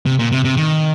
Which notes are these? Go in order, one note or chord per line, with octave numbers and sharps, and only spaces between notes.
C3
A#2
C3
C3
D#3